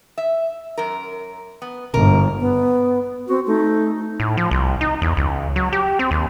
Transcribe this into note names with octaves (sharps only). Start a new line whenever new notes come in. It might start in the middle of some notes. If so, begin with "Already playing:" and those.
E5
F#2 A#4
B3
G1 G#2 A#4
B3
C4 F#4
A3 D#4
A2
F3
C2
D#4
E2
C#2
F#3
G4
C4
D#2